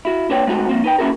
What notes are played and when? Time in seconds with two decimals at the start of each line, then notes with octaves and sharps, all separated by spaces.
0.05 E4 F#4
0.29 A#3 D4 B4 C#5 G5
0.47 G#3 A3 B3 C4 D#4 F#4
0.69 F3 A#3 C4
0.84 D#4 B4 G5
0.98 A#3 C#4 E4 F#4 G#4 A#4